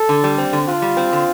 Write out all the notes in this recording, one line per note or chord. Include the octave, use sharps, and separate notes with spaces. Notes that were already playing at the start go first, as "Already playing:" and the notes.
Already playing: A4
D3
G3
C4
D3
D3 F4
G3
C4
D3